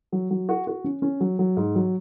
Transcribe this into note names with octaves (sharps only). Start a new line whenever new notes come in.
F#3
F#3
F#4
F#4
C#4
C#4
F#3
F#3
G#2
F#3